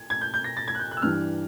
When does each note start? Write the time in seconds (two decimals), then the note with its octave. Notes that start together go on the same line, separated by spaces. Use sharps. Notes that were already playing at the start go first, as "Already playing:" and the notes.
Already playing: G#6
0.10 G#6
0.21 G6
0.34 G6
0.44 A#6
0.57 A6
0.68 G#6
0.75 F#6
0.79 G6
0.91 F#6
0.97 E6
1.02 G2 E3 G3 F6